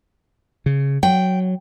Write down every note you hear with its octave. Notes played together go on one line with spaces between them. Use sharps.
C#3
F#3 G5